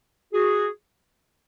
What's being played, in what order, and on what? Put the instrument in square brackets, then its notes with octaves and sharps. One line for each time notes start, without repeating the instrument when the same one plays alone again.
[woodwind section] F#4 G#4